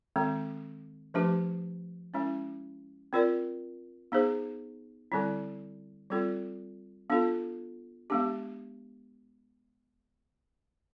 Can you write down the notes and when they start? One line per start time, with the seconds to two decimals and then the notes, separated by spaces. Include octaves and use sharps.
0.16 D#3 G#3 C4
1.14 F3 A3 D4 G4 B4
2.14 G#3 C#4 E4
3.13 C4 F4 A#4 D5
4.12 B3 D#4 G#4 C5
5.12 D3 G3 C4 E4
6.10 G3 C4 F4 A4
7.10 B3 D4 F4 A4
8.10 G#3 B3 D4 G4